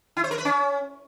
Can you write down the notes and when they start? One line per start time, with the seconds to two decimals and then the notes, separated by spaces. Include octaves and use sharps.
0.17 E4
0.24 C5
0.31 A#4
0.38 B4
0.45 C#4